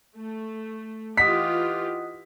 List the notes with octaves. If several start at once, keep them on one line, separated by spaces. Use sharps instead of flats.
A3
E3 F4 G4 D#5 F#5 D#6 B6